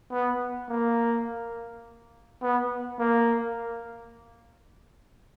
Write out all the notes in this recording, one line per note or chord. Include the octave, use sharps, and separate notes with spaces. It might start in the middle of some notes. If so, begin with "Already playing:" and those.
B3
A#3
B3
A#3